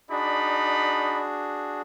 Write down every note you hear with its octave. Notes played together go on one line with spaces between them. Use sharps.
D4 D#4 F#4 G#4 D5 B5